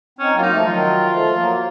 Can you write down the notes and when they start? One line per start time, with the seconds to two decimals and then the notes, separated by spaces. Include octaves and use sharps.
0.19 C4 C#4 D#4
0.34 F#3 A#3 F4
0.42 D#4
0.50 F3 A3
0.65 D#3 F#3 F4
1.11 F3 A3
1.35 F#3 A#3